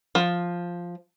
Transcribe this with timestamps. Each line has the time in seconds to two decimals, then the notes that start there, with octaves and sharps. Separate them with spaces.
0.15 F3